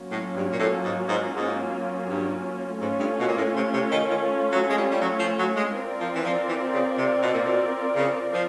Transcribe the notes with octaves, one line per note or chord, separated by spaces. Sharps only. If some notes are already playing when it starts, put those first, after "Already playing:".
Already playing: F#3 A#3 C#4 F4
A2
G2
A#2
A2
G#2
G#2
G#2
G2
G#2 A3 C#4 F4
G2
B2
A#2
A2
C3
C3
D#3
D#3
F#3
G#3
G3
G3
F#3
F3
F#3
G#3
C4 F4 A#4 D5
F3
E3
F3
E3
C#3
C3
B2
A#2
B2
C#3
F3